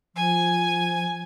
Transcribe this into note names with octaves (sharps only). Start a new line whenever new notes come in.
F3 G#5